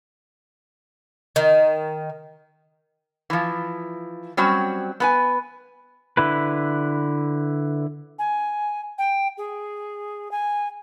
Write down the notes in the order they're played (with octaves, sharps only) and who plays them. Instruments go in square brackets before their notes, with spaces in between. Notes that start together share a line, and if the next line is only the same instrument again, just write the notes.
[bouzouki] D#3
[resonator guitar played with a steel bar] E3 F3
F#3 G3 C4 C#4 F#4
B3 B4 G#5
[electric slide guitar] D3 E4 B4
[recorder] G#5
G5
G#4
G#5